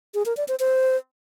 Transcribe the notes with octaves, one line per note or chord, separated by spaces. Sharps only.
G#4
A#4
D5
C5
C5